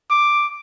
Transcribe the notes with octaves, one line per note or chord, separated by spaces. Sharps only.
D6